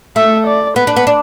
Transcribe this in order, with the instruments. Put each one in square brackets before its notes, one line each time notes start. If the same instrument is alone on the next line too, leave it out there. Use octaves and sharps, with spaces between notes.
[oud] A3 [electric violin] E5
[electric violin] D5
[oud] B3 [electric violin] B4
[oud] D4
B3
D4